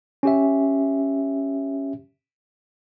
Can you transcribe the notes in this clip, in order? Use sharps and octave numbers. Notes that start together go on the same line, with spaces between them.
C#4 G4 E5